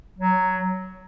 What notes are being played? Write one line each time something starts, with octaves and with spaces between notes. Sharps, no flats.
F#3